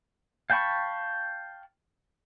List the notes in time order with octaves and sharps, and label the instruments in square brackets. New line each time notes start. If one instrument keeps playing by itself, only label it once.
[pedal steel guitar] F5 G5 A5 B5 C#6